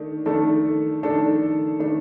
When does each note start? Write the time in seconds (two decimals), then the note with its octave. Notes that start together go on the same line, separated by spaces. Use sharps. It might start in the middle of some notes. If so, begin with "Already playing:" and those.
Already playing: D#3 A3 D4
0.26 D#3 A3 D4 A4
1.03 D#3 A3 D4 A4
1.80 D#3 A3 D4 A4